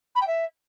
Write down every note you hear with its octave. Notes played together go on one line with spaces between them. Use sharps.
B5
G5
E5